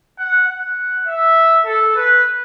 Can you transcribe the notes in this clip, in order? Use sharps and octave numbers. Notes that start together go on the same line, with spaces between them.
F#5
F#5
E5
A4
B4